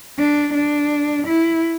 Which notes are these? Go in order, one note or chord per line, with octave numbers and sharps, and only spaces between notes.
D4
D4
E4